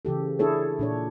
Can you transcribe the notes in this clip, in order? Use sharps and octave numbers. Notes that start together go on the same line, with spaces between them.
C#3 E3 G4 A4
D4 E4 G#4 A4 C#5
A#2 D4 C#5